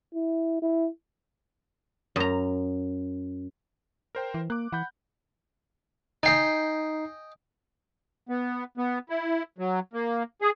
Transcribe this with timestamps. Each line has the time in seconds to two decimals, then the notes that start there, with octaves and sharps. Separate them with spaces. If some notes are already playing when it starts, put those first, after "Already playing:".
0.14 E4
0.62 E4
2.16 F#2 A#5
4.15 A#4 C5 G5
4.34 E3
4.50 A#3 D6 F#6
4.72 E3 F#5 B5 G6
6.23 D#4 D#5 G5 G#5 C7
8.29 B3
8.78 B3
9.10 E4
9.58 F#3
9.93 A#3
10.42 G#4